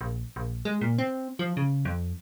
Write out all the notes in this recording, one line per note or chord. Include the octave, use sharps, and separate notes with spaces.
A#1
A#1
G#3
A#2
C4
F3
C#3
F2